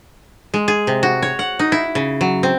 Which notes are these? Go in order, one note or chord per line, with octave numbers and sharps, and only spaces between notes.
G#3
G#4
C3
F#4
C#5
F#5
D#4
E4
C#3
F#3
C4